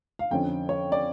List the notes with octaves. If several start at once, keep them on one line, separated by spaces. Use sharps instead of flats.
F5
F2 D3 F3 C#4 G5
C#5
D5